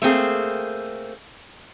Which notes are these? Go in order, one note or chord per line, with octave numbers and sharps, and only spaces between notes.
A3 A#3 C4 G#4